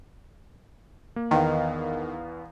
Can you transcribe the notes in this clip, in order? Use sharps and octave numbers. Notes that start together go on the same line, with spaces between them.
A#3
E2 D#3 B3 F5